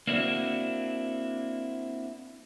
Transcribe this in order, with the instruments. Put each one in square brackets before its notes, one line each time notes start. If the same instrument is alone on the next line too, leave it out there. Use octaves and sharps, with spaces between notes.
[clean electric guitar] A#3 C4 D4 E4 F#4